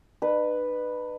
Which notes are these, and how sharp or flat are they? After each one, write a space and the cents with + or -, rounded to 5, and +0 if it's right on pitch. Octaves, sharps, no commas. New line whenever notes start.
D#4 -45 B4 +0